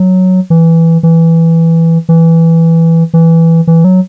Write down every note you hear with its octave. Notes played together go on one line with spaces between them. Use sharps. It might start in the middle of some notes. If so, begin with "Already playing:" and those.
Already playing: F#3
E3
E3
E3
E3
E3
F#3